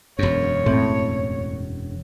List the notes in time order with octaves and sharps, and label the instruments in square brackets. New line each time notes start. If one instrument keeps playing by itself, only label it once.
[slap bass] E1 F#2 [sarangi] C#5
[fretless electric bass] A2 [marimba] E3 C4